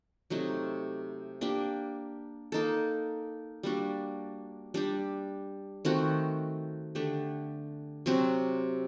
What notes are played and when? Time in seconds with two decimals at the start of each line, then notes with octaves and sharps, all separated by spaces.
0.30 C3 F#3 A3 D#4
1.41 A#3 D4 G4
2.52 A#3 D#4 A4
3.63 G3 A#3 D4 F#4
4.74 G3 D4 G4
5.85 D#3 A3 C4 F#4
6.95 D3 A3 D4 G4
8.06 C3 F#3 C4 F#4